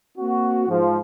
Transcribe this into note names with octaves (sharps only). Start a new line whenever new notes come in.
A#3 C4 F#4
G#2 F3